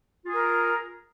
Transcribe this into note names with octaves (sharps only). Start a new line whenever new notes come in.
F4 G#4 A#4